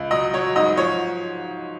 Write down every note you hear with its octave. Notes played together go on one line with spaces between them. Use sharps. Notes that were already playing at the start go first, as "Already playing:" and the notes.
Already playing: C#2
F#3 D#5
F#3 C#5
G#2 D#5
F3 C#5